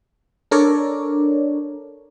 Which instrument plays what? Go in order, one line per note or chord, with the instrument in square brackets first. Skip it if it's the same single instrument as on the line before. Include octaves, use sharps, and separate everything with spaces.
[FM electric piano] D4 A4 A#4 C#5 D5